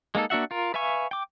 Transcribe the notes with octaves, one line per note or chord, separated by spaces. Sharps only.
G#3 A#3 D#4 A4
A#3 D4 F#4 E5 F#5
F4 A#4
B4 E5 F5 G#5 C#6
G5 D6